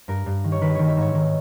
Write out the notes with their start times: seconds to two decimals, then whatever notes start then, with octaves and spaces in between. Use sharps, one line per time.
0.08 G2 A#4
0.26 G2
0.44 D#3
0.52 C#5
0.61 D#3 B4
0.75 D#3 C#5
0.88 E5
0.97 G#2 C#5
1.15 D#3